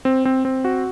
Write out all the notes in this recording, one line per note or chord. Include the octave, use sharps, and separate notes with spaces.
C4
C4
C4
F#4